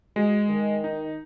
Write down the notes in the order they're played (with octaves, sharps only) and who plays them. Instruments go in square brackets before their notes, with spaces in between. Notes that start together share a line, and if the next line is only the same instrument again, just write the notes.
[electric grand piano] G#3 [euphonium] F#4
[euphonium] D#3
[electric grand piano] D#4